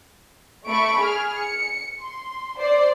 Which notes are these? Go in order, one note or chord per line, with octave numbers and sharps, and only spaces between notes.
A3 B5 C#6 D7
G#4 F6
C#7
C6
C5 D5 C7